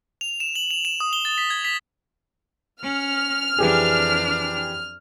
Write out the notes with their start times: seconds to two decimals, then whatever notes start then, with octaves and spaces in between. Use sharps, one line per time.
0.21 F7
0.40 E7
0.56 F#7
0.71 F7
0.85 E7
1.00 D#6
1.13 G7
1.25 A6
1.38 B6
1.50 G#6
1.65 B6
2.83 C#4 F6
3.58 F2 E3 D4 G4 G#4